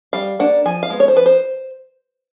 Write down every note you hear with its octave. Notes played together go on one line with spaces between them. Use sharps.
G3 F5
A#3 D4 F#5
F3 G#5
F5
G#3 B3
C#5
C5
F3 B4
C5